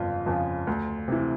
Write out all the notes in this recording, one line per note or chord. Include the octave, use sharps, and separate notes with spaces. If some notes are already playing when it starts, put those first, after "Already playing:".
Already playing: G1 F2 C#3 F3 F4
F2 C#3 F3
D2
C3 E3